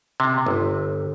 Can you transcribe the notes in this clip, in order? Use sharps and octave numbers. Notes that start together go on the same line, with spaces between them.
C3
G1